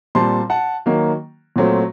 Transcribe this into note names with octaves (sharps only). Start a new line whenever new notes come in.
A#2 G3 C4 A5 C6
F#5 A5
D#3 F#3 A#3
A#2 F#3 A3 C4